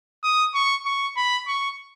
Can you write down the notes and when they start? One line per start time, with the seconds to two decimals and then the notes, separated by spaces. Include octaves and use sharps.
0.24 D#6
0.54 C#6
0.86 C#6
1.17 B5
1.48 C#6